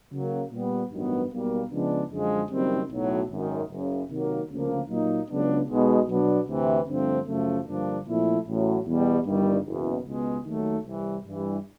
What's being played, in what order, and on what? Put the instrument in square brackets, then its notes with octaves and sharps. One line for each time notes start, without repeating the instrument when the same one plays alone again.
[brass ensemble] C#3 F#3 A#3
A#2 G3 B3
A1 G2 D#3 F#3 B3
B1 B2 G3 A#3
C#3 F3 G#3 B3 D4
F#2 D3 F3 G#3
F#1 F#2 D#3 G3 C4
B1 A2 F#3
G#1 F#2 D#3
F#1 F#2 C#3
C3 D#3 F#3 A#3
D2 C#3 F3 A#3
A#2 F#3 A#3 D#4
C#2 C#3 F#3 B3 D4
B1 B2 G#3
B2 F#3 B3 D4
D2 C3 E3
G2 D3 F3 A3 C4
F#2 C#3 F3 A3
G2 D3 F3 A#3 D4
A#2 F3 A3 C4 E4
A1 A2 F#3
E2 B2 G3
G1 G2 D#3 G3
F#1 E2 B2
C#2 B2 G#3 B3
D#2 D#3 F#3 A3
C2 C3 E3 G3
G2 E3 G3